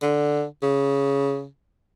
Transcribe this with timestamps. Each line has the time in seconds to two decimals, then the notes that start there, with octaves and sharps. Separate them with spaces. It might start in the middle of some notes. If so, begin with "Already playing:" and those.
0.02 D3
0.62 C#3